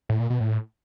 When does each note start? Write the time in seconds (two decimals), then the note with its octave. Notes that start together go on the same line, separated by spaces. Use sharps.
0.09 A2
0.20 A#2
0.30 B2
0.40 A2